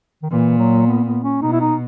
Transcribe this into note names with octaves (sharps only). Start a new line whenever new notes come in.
D#3
A#2 E3
F#3
B3
B3
C#4
B2 D#4
E4
D#4